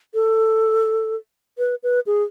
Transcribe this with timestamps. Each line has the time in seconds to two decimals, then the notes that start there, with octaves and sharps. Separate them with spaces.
0.14 A4
1.58 B4
1.83 B4
2.06 G#4